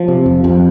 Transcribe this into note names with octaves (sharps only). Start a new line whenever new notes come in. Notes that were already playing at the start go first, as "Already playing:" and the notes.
Already playing: F3
C3
F2
F2